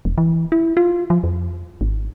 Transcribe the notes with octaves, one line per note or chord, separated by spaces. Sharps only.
E1
E3
E4
F4
F3
F2
G#1